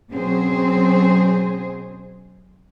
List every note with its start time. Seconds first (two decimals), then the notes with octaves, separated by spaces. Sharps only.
0.11 B2 F#3 C4 C#4 G#4 C5